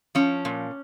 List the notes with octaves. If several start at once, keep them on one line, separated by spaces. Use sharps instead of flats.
F3 C#4
A#2